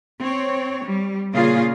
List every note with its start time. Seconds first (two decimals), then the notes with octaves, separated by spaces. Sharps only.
0.20 C4 C#5
0.85 G3
1.34 A#2 C#3 A#3 C#4 F4 G#4